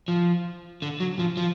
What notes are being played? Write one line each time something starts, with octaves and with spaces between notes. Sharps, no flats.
F3
D3
F#3
F3
F3